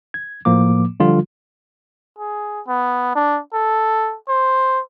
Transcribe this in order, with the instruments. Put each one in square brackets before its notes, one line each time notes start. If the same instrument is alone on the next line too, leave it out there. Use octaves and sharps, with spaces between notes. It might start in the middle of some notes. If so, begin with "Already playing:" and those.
[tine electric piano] G#6
A2 F3 A#3 D6
D3 F3 G3 F4
[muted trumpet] G#4
B3
D4
A4
C5